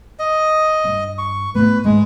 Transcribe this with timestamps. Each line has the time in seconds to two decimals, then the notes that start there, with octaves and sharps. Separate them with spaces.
0.19 D#5
0.84 G2
1.18 C#6
1.55 A2 B3 B4
1.85 D2 G#2 G#3